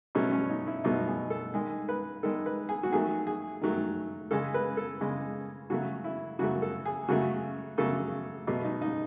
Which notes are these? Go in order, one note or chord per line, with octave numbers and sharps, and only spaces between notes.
B2 F#3 A3 C#4
C#4
D#4
E4
B2 F#3 A3 D#4
G#4
A4
D#3 G#3 G#4
B4
D#3 G#3 A4
B4
G#4
F#4
D#3 F#3 A3 G#4
G#4
D#3 F#3 A3
C#3 G#3 A4
B4
A4
C#3 G#3
C#3 F#3 A3 F#4
E4
C#3 F#3 A3 F#4
A4
G#4
C#3 F#3 A3 F#4
C#3 F#3 A3 A4
B2 F#3 A3
D#4
D#4